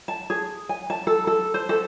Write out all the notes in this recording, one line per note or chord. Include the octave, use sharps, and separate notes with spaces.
A5
G#4
G#5
A5
A4
A4
C5
A4